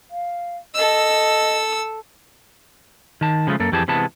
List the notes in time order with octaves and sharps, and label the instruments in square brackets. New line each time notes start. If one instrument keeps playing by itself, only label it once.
[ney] F5
[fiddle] A4 E6 [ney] D#5
[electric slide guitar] D#3 A5
C#3 F3 G#3 A3
F#2 A#3 A4
F2 E3 G4 G#4 A5
C3 E3 G#3 B3 A5